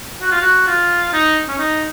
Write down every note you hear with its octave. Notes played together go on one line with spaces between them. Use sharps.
F#4
F4
F#4
F4
D#4
C#4
D#4